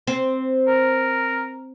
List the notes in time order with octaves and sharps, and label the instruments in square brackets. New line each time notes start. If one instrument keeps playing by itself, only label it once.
[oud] C4
[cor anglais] A#4